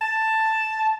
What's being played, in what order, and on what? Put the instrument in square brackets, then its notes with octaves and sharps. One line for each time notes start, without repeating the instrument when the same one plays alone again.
[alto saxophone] A5